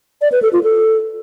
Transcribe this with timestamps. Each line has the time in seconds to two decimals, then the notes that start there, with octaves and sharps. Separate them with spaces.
0.21 D5
0.32 B4
0.42 A4
0.53 F4
0.63 A4